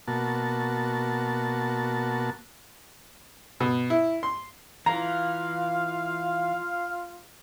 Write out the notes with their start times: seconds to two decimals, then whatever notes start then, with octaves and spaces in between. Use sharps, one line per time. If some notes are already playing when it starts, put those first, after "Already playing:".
0.08 B2 A#3 F#4 A5
3.60 B2
3.90 E4
4.23 C6
4.86 E3 F4 F5 A#5